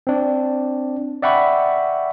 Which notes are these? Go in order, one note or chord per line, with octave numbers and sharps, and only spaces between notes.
C4 D4
D5 E5 F#5 G5 B5 C#6